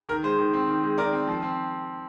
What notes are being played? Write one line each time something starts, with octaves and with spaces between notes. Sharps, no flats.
D#3 A#4
G#3 C5
D#3
C4
D#3
G#3
D#3 A#4 D5
C4
F3
C4